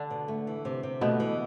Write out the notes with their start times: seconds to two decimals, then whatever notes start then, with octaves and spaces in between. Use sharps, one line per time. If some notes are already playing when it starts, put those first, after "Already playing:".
Already playing: D3 D4
0.11 B2
0.28 A3
0.47 E3
0.65 C3
0.83 C3
1.01 B2 A3 B3
1.20 E3